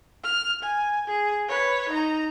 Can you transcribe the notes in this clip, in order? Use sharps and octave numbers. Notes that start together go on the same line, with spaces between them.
F6
G#5
G#4
B4 C#5
D#4 A#5